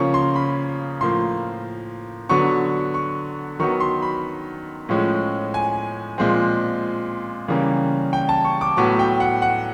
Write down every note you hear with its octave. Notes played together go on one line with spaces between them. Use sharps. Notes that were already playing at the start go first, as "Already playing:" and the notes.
Already playing: C#3 F3 A#3 C#4 C#6
C6
B5
A2 F3 A#3 C6
D3 F#3 B3 C#6
C#6
D#3 F#3 B3 C#6
C6
B5
A2 F3 G#3 C#4
G#5
A#2 F3 G#3 C4
C#3 E3 G3 A#3 C#4
G5
A5
C#6
D6
A2 F#3 B3 C#6
G5
F#5
F#5